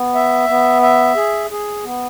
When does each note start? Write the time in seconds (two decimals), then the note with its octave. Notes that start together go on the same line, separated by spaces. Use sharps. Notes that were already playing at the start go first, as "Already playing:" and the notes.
Already playing: B3
0.15 E5
0.49 B3
0.82 E5
1.16 G#4
1.51 G#4
1.84 B3